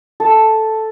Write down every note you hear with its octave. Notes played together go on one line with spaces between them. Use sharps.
A4